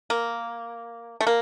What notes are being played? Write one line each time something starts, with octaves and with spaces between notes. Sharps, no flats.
A#3
A3
A#3